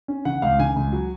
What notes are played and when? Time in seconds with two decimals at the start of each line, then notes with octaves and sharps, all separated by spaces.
0.08 C#4
0.25 C#3 F#5
0.42 C#2 F5
0.59 C#3 G#5
0.76 C#2
0.92 F#3